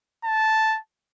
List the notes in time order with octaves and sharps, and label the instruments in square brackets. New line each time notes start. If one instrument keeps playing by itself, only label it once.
[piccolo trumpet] A5